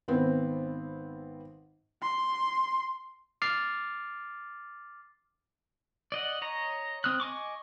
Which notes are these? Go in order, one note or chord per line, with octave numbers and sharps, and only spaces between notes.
G#1 B3 C4
C6
D6 F6 A6 C7
D5 D#5 F#5
C#5 D#5 A#5
C4 D#6 F6 F#6
D#5 G#5 C#6 D6